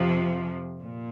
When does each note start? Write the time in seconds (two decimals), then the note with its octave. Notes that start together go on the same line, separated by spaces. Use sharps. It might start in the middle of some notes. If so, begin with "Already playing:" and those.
Already playing: F2 C3 F3
0.81 A#2